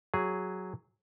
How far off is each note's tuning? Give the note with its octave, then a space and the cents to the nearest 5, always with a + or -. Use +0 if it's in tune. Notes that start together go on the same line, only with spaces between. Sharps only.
F#3 +0 G#4 -5